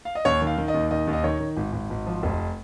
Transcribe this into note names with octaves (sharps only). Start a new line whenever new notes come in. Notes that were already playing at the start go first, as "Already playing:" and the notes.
F5
D#5
D#2 C#5
D#3
F5
D#3
D#5
D#2
D#3 D#5
D#2
D#5
D#3 C#5
D#3
G#1
G#1
G#1
F3
F1